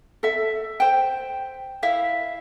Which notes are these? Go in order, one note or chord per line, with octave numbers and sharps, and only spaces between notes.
A4 E5
C5 G5
E4 E5 F5